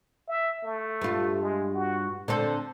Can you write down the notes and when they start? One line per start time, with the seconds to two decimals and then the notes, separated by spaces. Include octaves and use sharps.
0.28 E5
0.64 A3
1.01 G2 F4
1.42 G#3
1.74 F#4
2.28 D3 C4 A4 C5